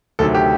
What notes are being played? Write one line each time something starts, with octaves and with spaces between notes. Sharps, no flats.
D2 C3 D#3 F#3 A4
G4